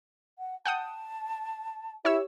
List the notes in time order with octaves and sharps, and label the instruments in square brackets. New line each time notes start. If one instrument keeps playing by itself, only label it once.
[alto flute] F#5
[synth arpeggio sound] F#5 G5 D#6 [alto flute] A5
[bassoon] E4 [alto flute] G4 [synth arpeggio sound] C#5 E6